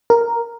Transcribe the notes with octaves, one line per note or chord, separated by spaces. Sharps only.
A#4